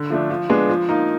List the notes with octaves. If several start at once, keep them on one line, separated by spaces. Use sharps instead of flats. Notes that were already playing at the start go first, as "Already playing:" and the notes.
Already playing: D3
F3 A3 D4
F3
G#3 B3 D4
F3
A#3 D#4